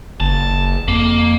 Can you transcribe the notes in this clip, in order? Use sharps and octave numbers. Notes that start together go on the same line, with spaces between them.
F#1 A5
F2 A#3